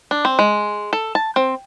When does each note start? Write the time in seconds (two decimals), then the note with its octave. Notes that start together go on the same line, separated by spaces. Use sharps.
0.11 D4
0.25 C4
0.39 G#3
0.93 A4
1.15 A5
1.36 C4